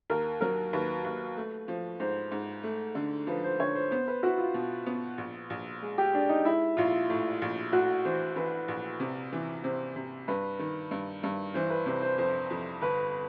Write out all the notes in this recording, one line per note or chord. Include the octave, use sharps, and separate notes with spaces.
D#2 A#4
F#3 A#4
D#2 B4
D#2
A3
F3
G#2 C5
G#2
A3
D3
F3 B4
C5
D3 C#5
C5
B3 C5
B4
E4 F#4
F4
B2
B3
A#1
A#1
G#3
G4
G#3 D4
D#4
G#3 E4
A#1 F4
A2
A#1
A2 F#4
E3 C5
E3 B4
A#1
C3
E3
C3 C5
C3
G2 B4
D#3
G2
G2
E3 C5
B4
C3 C5
C5
F2 C5
F2
G1 B4